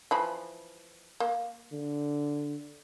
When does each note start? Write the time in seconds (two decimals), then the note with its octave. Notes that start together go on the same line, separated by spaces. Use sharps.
0.11 E3 F3 B5
1.20 A#3
1.72 D3